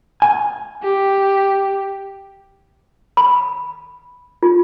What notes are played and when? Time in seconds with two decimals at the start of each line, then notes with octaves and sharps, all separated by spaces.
0.22 G#5
0.83 G4
3.17 B5
4.43 F4